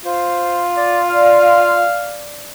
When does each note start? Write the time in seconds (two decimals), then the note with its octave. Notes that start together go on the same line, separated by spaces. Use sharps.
0.05 F4 C5
0.77 D5
1.09 D4 F5